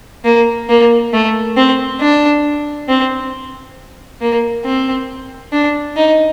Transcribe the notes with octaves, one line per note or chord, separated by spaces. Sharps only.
A#3
A#3
A3
C4
D4
C4
A#3
C4
D4
D#4